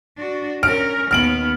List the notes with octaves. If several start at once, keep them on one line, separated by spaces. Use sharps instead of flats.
D4 F#4
C#4 A#4 F6 D7
D#2 B3 F6 D7 F#7